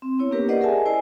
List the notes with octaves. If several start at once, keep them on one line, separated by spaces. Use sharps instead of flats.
C4
B3 E4 C#5
A#3 C#4 D4 G4 A#4 B4
G4 A#4 C5 D5 D#5 F#5
G#4 A#4 D#5 E5 G#5 A5
E4 C5 D5 G#5